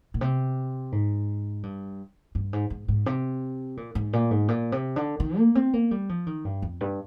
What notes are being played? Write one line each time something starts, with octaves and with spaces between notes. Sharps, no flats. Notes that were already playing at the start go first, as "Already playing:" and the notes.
A#2
C3
G#2
G2
G2
G#2
G#2
G#2
C3
A#2
G#2
A#2
G#2
A#2
C3
D3
D#3
A#3
C4
A#3
G3
F3
D#3
G2
F2
G2